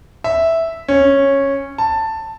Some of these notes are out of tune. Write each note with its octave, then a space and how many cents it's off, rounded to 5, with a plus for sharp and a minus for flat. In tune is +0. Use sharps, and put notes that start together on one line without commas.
E5 -5
C#4 -10
A5 +10